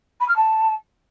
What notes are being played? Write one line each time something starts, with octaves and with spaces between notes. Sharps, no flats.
B5
F6
A5